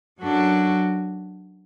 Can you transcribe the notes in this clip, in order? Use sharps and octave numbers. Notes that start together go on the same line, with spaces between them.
F#2 F#3 D4 F#4 A4